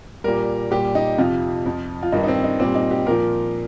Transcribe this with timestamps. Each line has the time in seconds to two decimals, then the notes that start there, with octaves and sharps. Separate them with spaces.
0.24 A#2 G3 A#4
0.71 A#2 G3 G4
0.95 D#4
1.18 F2 C3 F3 F4
1.66 F2 F3
2.03 F4
2.12 G2 D#3 G3 D#4
2.24 D#4
2.28 C4
2.44 D#4
2.60 A#2 G3 C4
2.75 D#4
2.91 G4
3.07 A#2 F3 A#4